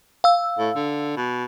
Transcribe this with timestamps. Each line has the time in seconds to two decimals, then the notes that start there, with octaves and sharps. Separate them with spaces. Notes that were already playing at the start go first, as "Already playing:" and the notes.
0.24 F5 E6
0.59 A2
0.76 D3
1.17 B2